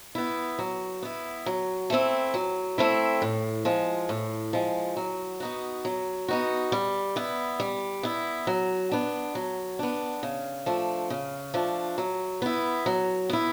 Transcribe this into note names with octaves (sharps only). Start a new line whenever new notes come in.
B3 E4
F#3
B3 E4
F#3
A3 C4 E4
F#3
A3 C4 E4
A2
F3 G#3
A2
F3 G#3
F#3
B3 D#4 F#4
F#3
B3 D#4 F#4
G3
B3 E4
G3
B3 E4
F#3
B3 D4
F#3
B3 D4
C#3
F3 A3 D4
C#3
F3 A3 D4
F#3
B3 E4
F#3
B3 E4